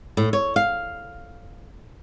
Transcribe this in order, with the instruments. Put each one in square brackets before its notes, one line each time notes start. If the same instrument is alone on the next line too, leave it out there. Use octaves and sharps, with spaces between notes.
[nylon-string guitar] A2
C#5
F5